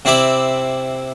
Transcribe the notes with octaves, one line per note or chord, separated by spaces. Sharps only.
C3 C4 E4 D5 B5 D6